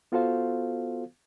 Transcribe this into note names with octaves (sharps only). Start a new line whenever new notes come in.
B3 F4 F#4 A4 C5 F5